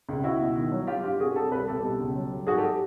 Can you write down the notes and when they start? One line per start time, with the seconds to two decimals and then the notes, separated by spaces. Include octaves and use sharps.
0.09 C#2
0.24 C#2 E4 F#4
0.40 B2
0.56 D#3
0.72 F#3
0.87 F#3 F4 G4
1.03 G2 F4 G4
1.20 C3 F#4 G#4
1.35 C3 G4 A4
1.51 C2 A4 B4
1.68 C2 G4 A4
1.83 B2
1.99 C#2
2.16 F#3
2.31 F#3
2.47 G#2 F#4 G#4
2.58 G4 A4